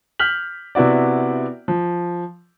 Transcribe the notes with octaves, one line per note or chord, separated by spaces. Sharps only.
F6 G6 B6 F#7
C3 B3 E4 F#4 D5
F3